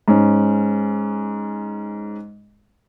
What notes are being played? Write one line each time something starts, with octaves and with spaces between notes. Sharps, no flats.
G#2 C#4